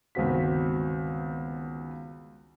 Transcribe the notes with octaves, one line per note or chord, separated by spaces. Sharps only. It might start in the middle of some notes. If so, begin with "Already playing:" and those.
G1 C#2 D#3 C4 F#4 B6